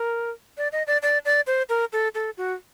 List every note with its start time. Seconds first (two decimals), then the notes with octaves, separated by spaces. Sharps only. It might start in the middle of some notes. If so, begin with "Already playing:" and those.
Already playing: A#4
0.58 D5
0.72 D#5
0.87 D5
1.03 D5
1.25 D5
1.47 C5
1.69 A#4
1.93 A4
2.15 A4
2.37 F#4